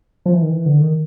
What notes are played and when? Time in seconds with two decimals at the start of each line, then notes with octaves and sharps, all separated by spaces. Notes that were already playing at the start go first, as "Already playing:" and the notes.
0.26 F3
0.34 E3
0.42 D#3
0.50 E3
0.66 D3
0.81 D#3